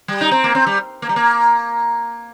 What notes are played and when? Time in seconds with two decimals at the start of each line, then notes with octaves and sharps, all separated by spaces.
0.08 G3
0.21 D#4
0.31 C4
0.44 A#3
0.55 C4
0.67 G3
1.02 A#3
1.09 G3
1.16 A#3